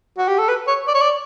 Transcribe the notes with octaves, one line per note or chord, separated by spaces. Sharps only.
F#4
G4
A4
B4
C#5
D5
C#5
D5